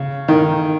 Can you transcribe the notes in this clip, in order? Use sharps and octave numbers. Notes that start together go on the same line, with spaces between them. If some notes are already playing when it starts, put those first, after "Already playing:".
Already playing: C#3
D#3